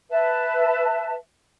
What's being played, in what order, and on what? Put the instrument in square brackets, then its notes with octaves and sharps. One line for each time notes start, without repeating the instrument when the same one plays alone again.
[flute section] B4 E5 A5